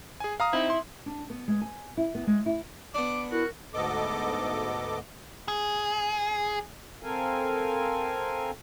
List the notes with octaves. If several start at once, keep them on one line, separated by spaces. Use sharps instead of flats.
G#4 G#5
F5 A#5 D#6
C4 D#4 E4
C6
D4
B3
G#3
G#5
E4
B3
G#3
E4
B3 D4 D6
E4 F#4 A#4
D2 G#2 B3 A4 D#5 D6
G#4
C4 A4 A#4 F5 G#5